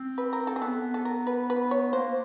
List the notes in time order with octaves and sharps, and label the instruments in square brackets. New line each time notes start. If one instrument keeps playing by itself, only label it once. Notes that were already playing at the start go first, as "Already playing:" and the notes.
Already playing: [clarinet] C4
[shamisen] B4
A#4
A4
G#4
[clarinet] B3 [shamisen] A4
[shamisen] A4
A#4
B4
B4
C#5
[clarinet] A#3 [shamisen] C5